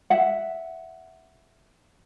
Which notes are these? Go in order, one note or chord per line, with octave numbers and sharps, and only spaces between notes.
E5 F#5